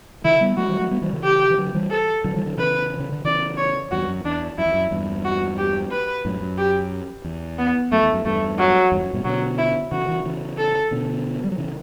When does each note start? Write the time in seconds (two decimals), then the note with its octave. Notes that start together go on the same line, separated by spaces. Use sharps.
0.24 C#3 E3 E4
0.41 G3 B3
0.57 F#3 A3 F#4
0.69 E3 G3
0.80 F#3 A3
0.91 G3 B3
1.02 E3 G3
1.13 C#3 E3
1.24 G4
1.50 E3
1.57 D3 F#3
1.74 E3 G3
1.90 A4
2.24 D3 F#3
2.36 E3 G3
2.46 D3 F#3
2.57 C#3 E3 B4
3.00 C#3
3.12 D3
3.24 C#3 E3 D5
3.57 C#5
3.91 E2 G2 F#4
4.08 F#2
4.24 E2 D4
4.58 F#2 E4
4.66 E2
4.74 F#2
4.91 E2 G2
5.25 F#4
5.58 G4
5.91 B4
6.25 F#2 A2
6.41 F#2
6.58 G4
7.24 E2
7.58 B3
7.92 F#2 A3
8.03 E2
8.14 F#2
8.25 E2 G2 A3
8.59 F#3
8.92 E2 G2
9.03 F#2
9.13 G2 B2
9.24 B2 D3 F#3
9.58 E4
9.92 C#3 E3 F#4
10.08 C#3 E3
10.25 C#3 E3
10.58 A4
10.91 B2 D3
11.44 G3
11.52 F#3
11.58 C#3 E3